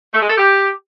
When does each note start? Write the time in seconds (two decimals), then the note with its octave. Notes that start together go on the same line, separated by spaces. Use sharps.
0.14 A3
0.22 G#3
0.30 A4
0.38 G4